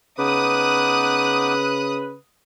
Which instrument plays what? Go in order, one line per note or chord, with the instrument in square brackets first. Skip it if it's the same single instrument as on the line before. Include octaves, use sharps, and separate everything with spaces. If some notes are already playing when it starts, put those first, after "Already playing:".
[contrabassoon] C#3 [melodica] B3 D#4 D6 [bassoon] B4 [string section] D#6 F#6